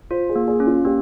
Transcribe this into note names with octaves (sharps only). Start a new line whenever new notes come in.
F4 C5
G#4
A#3
G#4
C#4
F4
A#3 G4